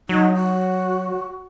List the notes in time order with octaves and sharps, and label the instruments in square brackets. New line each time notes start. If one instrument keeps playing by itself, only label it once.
[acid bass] F#3 [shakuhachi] D#4
[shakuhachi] F#4